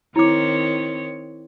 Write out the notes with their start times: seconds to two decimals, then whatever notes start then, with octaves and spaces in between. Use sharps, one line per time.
0.16 D#3 C4 E4 C#5 D6